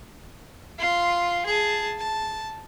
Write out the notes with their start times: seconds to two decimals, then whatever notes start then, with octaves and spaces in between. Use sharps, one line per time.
0.79 F4 C6
1.46 G#4 A5
1.99 A5